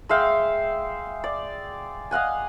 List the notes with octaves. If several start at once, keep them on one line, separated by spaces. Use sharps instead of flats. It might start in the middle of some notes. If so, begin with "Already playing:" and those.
G#3 E5 F5 G5
D5
D#5 F5 F#5 G#5